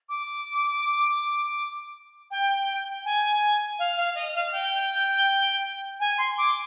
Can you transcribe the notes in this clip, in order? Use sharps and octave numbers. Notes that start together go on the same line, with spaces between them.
D6
G5
G#5
F5
F5
D#5
F5
G5
G#5
C6
D6